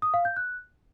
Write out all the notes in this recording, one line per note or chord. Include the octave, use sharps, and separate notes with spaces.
D#6
F5
G6
F#6